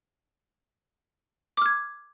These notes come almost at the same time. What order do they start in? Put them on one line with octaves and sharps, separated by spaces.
D6 F6 G#6